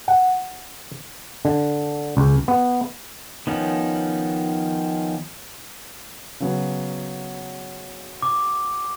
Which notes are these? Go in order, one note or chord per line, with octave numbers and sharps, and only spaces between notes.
F#5
D3
C#2
B3
D#3 F3 B3 C#4 D#4
C#3 F#3 B3
D6